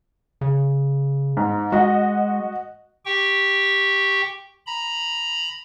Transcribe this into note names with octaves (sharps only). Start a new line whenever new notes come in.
C#3
G#2
G#3 F#4 D#5 F#5
G4 G5 C#6
A#5 B5